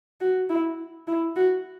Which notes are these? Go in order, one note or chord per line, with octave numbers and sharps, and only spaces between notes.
F#4
E4
E4
F#4